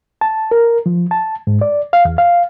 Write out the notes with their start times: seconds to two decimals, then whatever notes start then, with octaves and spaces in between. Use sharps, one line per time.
0.21 A5
0.51 A#4
0.86 F3
1.11 A5
1.47 G#2
1.61 D5
1.93 F5
2.05 E2
2.18 F5